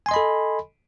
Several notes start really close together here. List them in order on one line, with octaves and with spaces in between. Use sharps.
G#5 C6 D#5 B5 A4